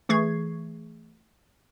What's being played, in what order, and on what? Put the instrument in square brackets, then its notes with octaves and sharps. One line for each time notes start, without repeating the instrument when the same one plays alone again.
[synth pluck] E3 A3 G#4 C#6 G#6 C7